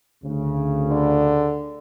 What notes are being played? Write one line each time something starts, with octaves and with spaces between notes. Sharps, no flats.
D2 C#3
D3